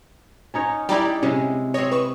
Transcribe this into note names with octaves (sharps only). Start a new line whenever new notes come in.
C#4 D#4 C#5
G3 D#4 E4 G4 D5 G5
C3 G#3 C#4
C4 C#5 D#5
B4 C#6 E7